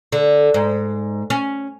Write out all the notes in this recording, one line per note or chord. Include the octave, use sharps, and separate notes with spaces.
D3
G#2
C#4